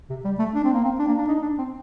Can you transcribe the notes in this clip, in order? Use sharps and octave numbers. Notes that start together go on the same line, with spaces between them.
C3
G3
A3
D4
C4
A#3
C4
D4
A#3
D4
D#4
D4
C4